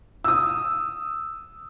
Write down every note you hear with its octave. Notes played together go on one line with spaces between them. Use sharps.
D#6 E6